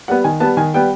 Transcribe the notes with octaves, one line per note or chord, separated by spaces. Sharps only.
G3 B3 F#5
D#3 G#5
G3 B3 A5
D#3 G#5
G3 B3 G5